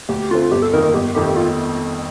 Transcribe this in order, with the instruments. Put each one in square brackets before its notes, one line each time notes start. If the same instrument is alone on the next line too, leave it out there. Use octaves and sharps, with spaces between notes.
[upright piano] D2 [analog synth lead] G4
[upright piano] D3 A3 C4 [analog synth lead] F4
[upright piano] G1 [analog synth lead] G4
[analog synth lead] A4
[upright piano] F2 D#3 A#3 D#4 [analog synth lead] A#4
[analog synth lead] A#4
[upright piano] G1 [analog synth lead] G4
[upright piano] F2 D#3 A3 [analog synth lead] G4
[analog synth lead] F4